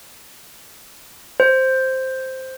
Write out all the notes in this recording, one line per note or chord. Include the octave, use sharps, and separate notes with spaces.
C5